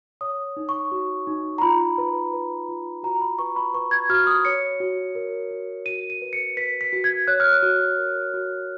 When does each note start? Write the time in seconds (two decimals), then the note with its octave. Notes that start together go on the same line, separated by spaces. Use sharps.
0.21 C#5 D#6
0.57 D#4
0.69 C#6
0.92 F#4
1.27 D#4
1.58 A#5
1.62 F4 B5
1.98 B4
2.33 B4
2.69 F4
3.03 F#4 A#5
3.21 B5
3.39 B4 C#6
3.56 B5
3.74 B4 C#6
3.91 G#6
4.10 F#4 F6
4.27 D#6
4.45 C#5 C#7
4.80 F#4
5.15 A#4
5.51 F#4
5.86 F#4 D#7
6.10 D#7
6.22 B4
6.33 C#7
6.57 B4 B6
6.81 B6
6.93 F#4
7.04 G#6
7.27 C#5 F#6
7.40 F6
7.53 F#6
7.63 F#4
7.98 A#4
8.34 F#4